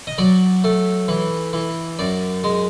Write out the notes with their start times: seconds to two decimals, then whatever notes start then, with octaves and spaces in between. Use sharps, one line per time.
0.07 D#5
0.18 F#3 D5
0.64 A3
1.08 E3
1.53 E3
1.99 F#2 D5
2.44 G#3